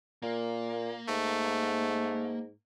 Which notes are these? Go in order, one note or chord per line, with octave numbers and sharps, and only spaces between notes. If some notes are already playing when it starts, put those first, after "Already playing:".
A#2 A#3
G#2 A3